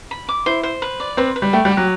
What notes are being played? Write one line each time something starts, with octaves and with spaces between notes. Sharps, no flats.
B5
D6
E4 C5
C5
B4
D5
C4 B4
B4
G3
A3 G5
G3
G4
F#3